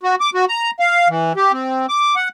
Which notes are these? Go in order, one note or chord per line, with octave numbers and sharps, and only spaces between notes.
F#4
D6
F#4
A#5
F5
E3
G4
C4
D6
F#5